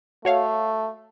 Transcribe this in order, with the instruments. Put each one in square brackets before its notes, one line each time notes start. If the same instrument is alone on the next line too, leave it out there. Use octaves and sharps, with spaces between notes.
[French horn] A3 [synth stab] F#4 C#5 F5